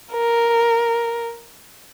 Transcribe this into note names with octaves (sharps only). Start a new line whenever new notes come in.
A#4